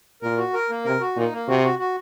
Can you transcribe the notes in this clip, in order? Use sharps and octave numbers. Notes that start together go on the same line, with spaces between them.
A#2 A#4
F#4
A#4
A#3
C3 A#4
F#4
A#2 D#4
A#3
C3 F#4
F#4
F#4